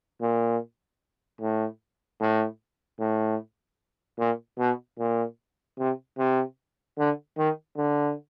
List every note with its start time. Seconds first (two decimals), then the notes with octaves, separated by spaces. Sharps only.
0.21 A#2
1.41 A2
2.21 A2
3.00 A2
4.19 A#2
4.58 B2
4.99 A#2
5.78 C3
6.18 C3
6.98 D3
7.37 D#3
7.77 D3